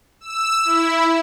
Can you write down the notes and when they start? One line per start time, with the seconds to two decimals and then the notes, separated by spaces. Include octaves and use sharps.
0.21 E6
0.65 E4